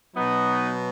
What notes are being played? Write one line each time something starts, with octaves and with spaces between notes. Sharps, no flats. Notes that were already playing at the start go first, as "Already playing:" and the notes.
B2 F#3 B3 D#4